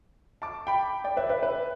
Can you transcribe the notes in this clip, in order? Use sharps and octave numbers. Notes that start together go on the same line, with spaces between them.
A5 D6
G5 B5
D5 G5
B4 E5
B4 E5
B4